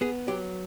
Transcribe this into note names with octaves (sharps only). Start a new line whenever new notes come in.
B3 G#4
F#3 G4